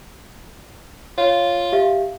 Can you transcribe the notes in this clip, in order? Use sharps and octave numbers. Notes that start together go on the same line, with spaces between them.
F4 C#5
G4 E5 F5